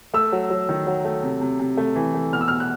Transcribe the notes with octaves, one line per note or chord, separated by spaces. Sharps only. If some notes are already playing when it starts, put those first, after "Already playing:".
A3 E6
F#3
F#3
D#3
F#3
A3
C3
C3
C3
A3
E3
A3
B2 F6
E6
B2 F6
F#6